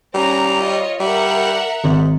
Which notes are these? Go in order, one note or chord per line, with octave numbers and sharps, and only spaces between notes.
G3 C#4 A#5
F4 C#5 D#5
G3 A#4 E5 F#5
G#1 G#2